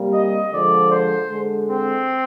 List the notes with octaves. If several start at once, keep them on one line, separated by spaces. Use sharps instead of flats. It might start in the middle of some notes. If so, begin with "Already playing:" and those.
Already playing: C3 G3 A#3
D#5
D3 F3 G#3 D5
C5
D3 G#3
C4